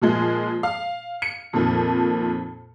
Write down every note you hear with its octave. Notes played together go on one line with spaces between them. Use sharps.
A#2 F3 G#3
F5
C#7
F2 A#2 D#3 F3